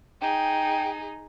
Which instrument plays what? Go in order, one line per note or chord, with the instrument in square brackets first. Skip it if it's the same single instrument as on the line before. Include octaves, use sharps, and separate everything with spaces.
[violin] D#4 G#4 [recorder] G5